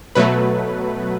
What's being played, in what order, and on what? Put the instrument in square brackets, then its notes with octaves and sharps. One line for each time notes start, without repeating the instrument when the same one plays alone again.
[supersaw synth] B2 F#3 A3 B4